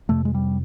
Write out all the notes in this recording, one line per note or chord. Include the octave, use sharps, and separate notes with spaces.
F2 C3 A3
G#3
G3